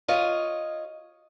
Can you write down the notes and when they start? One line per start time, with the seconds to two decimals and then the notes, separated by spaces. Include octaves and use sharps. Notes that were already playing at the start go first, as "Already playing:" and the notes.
0.08 F4 C#5 D#5